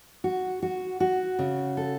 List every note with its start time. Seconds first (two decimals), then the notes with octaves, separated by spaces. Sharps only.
0.24 F#4
0.62 F#4
1.00 F#4
1.39 C#3
1.77 A4